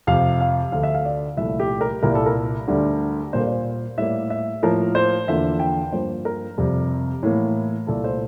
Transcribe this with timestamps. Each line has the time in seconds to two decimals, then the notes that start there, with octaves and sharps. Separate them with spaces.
0.07 F2 C3 F3 F5
0.40 F5
0.72 D2 D3 A3 F5
0.83 E5
0.95 F5
1.05 D5
1.37 C2 A#2 F3 A3 E5
1.60 G4
1.81 A#4
2.03 C2 A#2 G3 A#4
2.15 A4
2.26 A#4
2.68 D2 D3 G3
3.32 A#2 G3 A#3 C5
3.40 A#4
3.47 C5
3.97 A2 G3 A#3 E5
4.30 E5
4.62 A2 F3 A#3 A#4
4.95 C5
5.28 E2 D3 F3 A#3 E5
5.60 G5
5.92 G2 F3 A#3 C5
6.25 A#4
6.58 F2 C3 G3
7.23 A2 E3 A#3
7.87 C2 A#2 A3 A4
8.04 C5